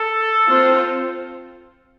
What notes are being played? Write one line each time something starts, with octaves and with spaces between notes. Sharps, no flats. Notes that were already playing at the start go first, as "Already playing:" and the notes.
Already playing: A4
C4 F4 C5